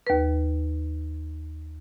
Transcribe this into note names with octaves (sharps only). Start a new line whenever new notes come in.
D#2 B4